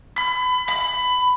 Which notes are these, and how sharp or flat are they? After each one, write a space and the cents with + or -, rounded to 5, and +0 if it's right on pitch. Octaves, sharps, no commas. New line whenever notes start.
B5 +30
B5 +15